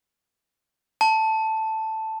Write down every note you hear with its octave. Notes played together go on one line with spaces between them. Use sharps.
A5